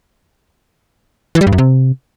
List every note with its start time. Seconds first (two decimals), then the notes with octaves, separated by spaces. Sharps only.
1.35 E3
1.41 G3
1.47 G2
1.53 F#2
1.58 C3